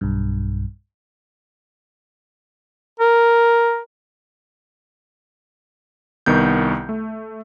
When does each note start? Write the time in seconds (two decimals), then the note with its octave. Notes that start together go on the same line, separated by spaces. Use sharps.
0.01 B1 G2
2.99 A#4
6.26 C2 D#3 B3 G6
6.89 A3